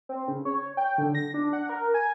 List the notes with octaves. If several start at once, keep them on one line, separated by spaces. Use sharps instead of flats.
C4
C#3
C#5
G5
D3
A#6
D4
F#5
A#4
G#5